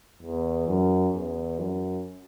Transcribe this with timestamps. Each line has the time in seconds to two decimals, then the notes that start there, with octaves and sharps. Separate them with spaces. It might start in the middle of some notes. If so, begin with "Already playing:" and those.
0.22 E2
0.68 F#2
1.14 E2
1.59 F#2